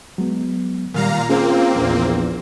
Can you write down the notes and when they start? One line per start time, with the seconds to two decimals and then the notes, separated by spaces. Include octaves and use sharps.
0.18 F#3 G#3 B3
0.94 A#2 D#3 G3 F5 A#5
1.30 A#3 C4 C#4 F4 G#4
1.75 A#1 E2